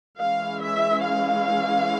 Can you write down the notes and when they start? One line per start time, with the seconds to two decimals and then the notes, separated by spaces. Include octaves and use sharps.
0.19 E3 G#3 C#4 E4 F5
0.62 E5
1.04 F5